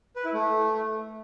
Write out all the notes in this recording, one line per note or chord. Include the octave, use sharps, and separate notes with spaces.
B4
E4
A3